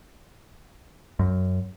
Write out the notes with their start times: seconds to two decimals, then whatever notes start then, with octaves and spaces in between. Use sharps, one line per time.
1.19 F#2